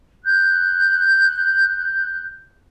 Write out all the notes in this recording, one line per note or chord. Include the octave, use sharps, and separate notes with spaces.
F#6 G6